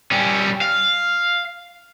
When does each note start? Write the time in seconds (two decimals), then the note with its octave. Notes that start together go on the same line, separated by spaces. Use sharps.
0.11 G3 C#4
0.61 F5